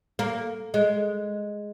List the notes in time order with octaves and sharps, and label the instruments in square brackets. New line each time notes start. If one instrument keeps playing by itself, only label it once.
[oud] A#3
G#3